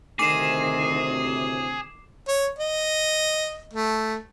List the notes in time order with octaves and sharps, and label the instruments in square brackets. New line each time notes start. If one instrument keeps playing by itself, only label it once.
[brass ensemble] D2 A2 C3 [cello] D#3 [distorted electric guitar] G#4 [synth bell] D6 C7 E7
[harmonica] C#5
D#5
A3